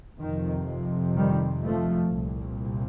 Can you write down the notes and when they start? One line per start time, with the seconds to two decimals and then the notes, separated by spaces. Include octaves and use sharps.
0.19 F2 C3 D#3
1.16 D#3 G3
1.64 F3 A3
2.12 C2 A#2